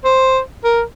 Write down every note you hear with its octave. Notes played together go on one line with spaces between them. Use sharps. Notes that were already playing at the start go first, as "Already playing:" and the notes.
C5
A#4